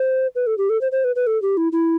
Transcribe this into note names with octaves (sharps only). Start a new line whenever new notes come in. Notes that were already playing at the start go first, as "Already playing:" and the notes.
Already playing: C5
B4
A4
G4
A4
C5
C5
B4
B4
A4
G4
E4
E4